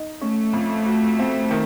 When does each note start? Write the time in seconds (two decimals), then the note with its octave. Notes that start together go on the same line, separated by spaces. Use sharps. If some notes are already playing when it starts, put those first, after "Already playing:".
Already playing: D#4
0.21 A3 C#4
0.53 F2
0.86 F#4
1.19 C4
1.50 D#3